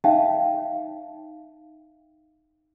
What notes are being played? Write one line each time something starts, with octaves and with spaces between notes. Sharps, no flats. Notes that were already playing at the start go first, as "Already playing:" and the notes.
D#4 C#5 E5 F5 G5 A5